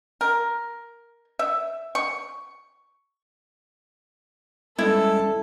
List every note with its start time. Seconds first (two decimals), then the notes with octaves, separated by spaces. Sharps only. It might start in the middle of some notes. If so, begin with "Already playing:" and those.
0.21 A#4
1.39 E5
1.95 C#6
4.79 G3 G#3 C#4 E4 A4